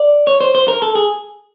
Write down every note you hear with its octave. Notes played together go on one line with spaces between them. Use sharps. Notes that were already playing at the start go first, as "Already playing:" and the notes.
Already playing: D5
C#5
C5
C5
A#4
A4
G#4